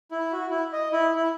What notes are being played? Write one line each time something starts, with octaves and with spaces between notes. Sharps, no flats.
E4
F#4
E4
D#5
E4
E4